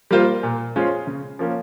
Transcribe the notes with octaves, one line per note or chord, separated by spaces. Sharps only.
G3 A#3 F4 C5
A#2
G#3 C#4 F4 C5
C#3
F3 A#3 C#4